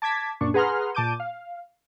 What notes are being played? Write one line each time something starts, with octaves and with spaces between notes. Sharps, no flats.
A5 D6 G#6 B6
F#2 A#2 D4 C#6
G#4 B4 F#5 A#5 C6 F6
A#2 A5 D6 G6 D#7
F5